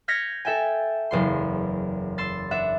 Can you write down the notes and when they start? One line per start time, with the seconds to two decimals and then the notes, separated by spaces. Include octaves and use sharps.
0.08 F6 G6 G#6 A#6 B6 C#7
0.45 A4 E5 G5 G#5
1.11 F#1 E2 C6
2.18 C6 E6 A6
2.51 D4 E5 F#5